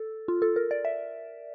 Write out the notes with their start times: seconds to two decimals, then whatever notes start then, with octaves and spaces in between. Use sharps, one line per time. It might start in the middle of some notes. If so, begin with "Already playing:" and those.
Already playing: A4
0.28 F4
0.42 A4
0.56 A#4
0.71 D5
0.85 E5